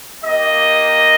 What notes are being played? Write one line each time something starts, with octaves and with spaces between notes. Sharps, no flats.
A#3 D#4 G4 D#5